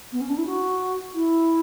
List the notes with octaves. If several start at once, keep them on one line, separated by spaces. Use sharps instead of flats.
B3
C#4
D4
E4
F#4
E4